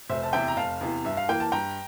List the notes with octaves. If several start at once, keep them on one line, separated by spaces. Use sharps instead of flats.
F1 C5 E5
A5
E2 C3 E3 E5 G5
A#5
F1 F5 A5
E2 C3 E3
G2 E5
F5
E3 A#3 G5
A5
G2 G5 A#5